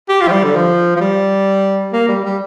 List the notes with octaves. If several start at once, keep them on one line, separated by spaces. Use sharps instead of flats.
G4
F4
F3
G3
D3
F3
F3
G3
A#3
G3
G3